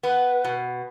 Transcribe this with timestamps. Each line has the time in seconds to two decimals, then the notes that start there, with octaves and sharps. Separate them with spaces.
0.03 B3 B4
0.45 B2